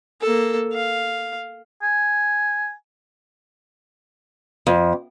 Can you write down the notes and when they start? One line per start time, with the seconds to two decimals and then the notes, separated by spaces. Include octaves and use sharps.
0.21 A#3 A4
0.73 F5
1.83 G#5
4.67 F2